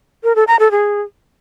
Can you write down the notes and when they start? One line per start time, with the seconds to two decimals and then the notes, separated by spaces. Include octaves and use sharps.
0.24 A#4
0.36 A4
0.48 A#5
0.59 A4
0.71 G#4